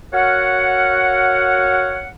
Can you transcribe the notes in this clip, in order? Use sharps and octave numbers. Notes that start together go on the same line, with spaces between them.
F#4 A#4 C#5 F5 F#5